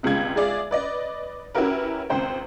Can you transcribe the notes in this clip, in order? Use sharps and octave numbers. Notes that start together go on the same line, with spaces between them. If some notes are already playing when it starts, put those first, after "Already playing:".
G1 C#2 C3 G#3 F4 G#6
G#3 F4 G#4 D5 E5
B4 D5 D#5
C#4 E4 F#4 G4 A#4 B4
G#1 C#2 C4 C5 G5